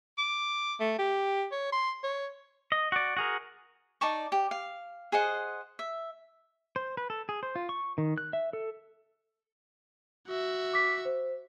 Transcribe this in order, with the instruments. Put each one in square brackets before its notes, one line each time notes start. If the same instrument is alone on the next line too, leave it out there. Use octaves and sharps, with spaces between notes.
[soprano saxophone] D6
A3
G4
C#5
C6
C#5
[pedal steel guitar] D#5
F#4 D5
F#4 G#4 A#4
[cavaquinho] D#4 D5 A5 C#6
G4
F5
G#4 C5 D#5 F#5
E5
[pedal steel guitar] C5
B4
A4
G#4
C5
F4
C#6
D#3
F#6
E5
A4
[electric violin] F#4 E5
[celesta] D6 B6
C5